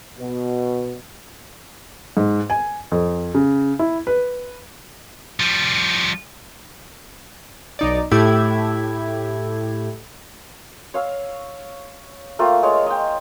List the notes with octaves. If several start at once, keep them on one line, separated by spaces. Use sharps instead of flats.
B2
G#2
G#5
F2
C#3
E4
B4
F3 G3
B1 D#4 D5
A2 A3 E4 G4 G#6
C#5 F5 E6
A3 A#3 F4 G5
G#3 C#5
D#5 G5